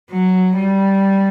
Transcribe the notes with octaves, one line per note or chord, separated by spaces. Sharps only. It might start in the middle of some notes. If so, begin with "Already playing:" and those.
F#3
G3